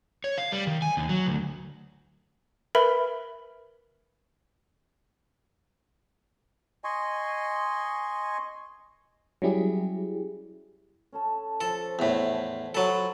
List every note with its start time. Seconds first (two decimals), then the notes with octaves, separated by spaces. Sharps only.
0.24 C#5
0.38 F5
0.52 G3
0.67 D#3
0.82 G#5
0.97 D#2
1.09 F#3
1.27 D2
2.75 A#4 B4 E5 B5
6.84 D#5 G#5 C6 C#6
9.42 F#3 G3 C#4 E4 G4 G#4
11.12 C#4 A4 A5
11.61 F3 A4
11.99 E2 A2
12.75 F#3 A4 B5 C6